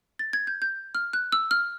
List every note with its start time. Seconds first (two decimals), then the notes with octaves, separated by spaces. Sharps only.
0.19 A6
0.33 G#6
0.47 G6
0.62 G6
0.95 F6
1.13 F#6
1.32 E6
1.51 F6